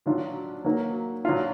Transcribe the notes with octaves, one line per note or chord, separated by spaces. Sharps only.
D#3 F#3 D4 F4
D#3 F#3 A#3
F#3 D4 F4